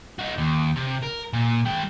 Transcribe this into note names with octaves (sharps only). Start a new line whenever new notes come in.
D#4 F#4
D#2
C3
A#4
A#2
G#3 G5